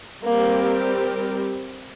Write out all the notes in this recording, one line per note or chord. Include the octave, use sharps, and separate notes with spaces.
G3 A#3 C4 G4 A#4